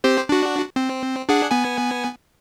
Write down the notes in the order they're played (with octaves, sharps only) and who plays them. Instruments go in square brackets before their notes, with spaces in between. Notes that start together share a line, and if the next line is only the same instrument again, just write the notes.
[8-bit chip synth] C4 G4 C5
D4 F#4
C4
D4 G#4 F#5
B3 G#5